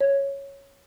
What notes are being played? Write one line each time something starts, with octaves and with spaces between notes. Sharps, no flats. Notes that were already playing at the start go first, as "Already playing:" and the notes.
C#5